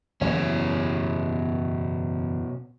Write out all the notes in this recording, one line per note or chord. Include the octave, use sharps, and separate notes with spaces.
F#1 E2 B2 E3 C#4